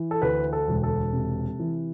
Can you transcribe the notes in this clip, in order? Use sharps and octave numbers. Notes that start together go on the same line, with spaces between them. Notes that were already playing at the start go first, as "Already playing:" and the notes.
Already playing: E3
A4
D2 B4
A4
E1
A4
C3
E3